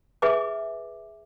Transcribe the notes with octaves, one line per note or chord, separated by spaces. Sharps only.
G#4 B4 E5 G#5 D6